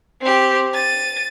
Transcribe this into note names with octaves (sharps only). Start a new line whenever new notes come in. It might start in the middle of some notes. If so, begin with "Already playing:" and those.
C4 G4
A6 D#7